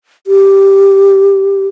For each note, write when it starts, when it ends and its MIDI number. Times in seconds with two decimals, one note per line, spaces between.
0.27 1.67 67